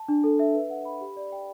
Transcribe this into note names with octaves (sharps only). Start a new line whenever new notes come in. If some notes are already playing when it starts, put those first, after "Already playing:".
Already playing: A5
D4
A4
E5
B4
F#5
B5
G4
D5
G5